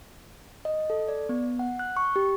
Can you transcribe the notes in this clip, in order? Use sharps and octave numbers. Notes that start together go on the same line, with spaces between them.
D#5
A4
D5
B3
F#5
F#6
C#6
G4